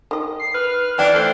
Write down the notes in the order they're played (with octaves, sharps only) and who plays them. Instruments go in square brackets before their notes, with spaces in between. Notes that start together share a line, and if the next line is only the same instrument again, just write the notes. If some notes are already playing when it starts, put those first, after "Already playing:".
[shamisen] D#3 D#5
[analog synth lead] C7
[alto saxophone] B4 [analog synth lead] F6
[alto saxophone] E3 [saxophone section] D4 [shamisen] G5
[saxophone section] A3 A4 C5